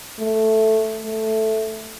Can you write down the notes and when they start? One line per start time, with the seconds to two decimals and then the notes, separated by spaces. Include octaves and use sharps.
0.19 A3
1.05 A3